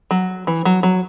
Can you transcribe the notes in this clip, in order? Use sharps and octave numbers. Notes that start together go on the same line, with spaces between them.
F#3
E3
F#3
F#3